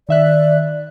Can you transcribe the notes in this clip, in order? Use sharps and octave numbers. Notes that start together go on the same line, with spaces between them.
D#3 D5 E5 F#6